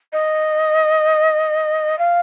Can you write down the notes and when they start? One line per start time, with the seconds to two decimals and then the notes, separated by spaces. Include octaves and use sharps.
0.13 D#5
1.98 F5